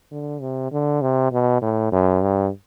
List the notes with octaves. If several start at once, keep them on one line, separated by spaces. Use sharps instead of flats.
D3
C3
D3
C3
B2
A2
F#2
G2